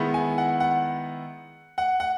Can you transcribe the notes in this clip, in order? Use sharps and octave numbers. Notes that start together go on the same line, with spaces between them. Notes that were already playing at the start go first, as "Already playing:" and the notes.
Already playing: D#3 G#3 B3 E4
G#5
F#5
F#5
F#5
F#5